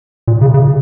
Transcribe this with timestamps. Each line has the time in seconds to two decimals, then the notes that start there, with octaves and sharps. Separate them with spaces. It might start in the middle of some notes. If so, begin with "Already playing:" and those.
0.28 A#2
0.41 C#3
0.54 C#3